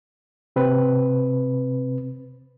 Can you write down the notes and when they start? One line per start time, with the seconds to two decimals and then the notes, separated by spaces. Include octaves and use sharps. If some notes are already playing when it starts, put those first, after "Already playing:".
0.56 C3 C4 B4